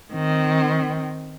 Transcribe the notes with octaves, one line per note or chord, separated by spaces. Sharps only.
D#3 C4